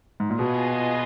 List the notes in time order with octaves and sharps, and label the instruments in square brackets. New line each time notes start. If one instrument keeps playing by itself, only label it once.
[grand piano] G#2
A#2
[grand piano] B2 [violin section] B3 F4 G#4 D#5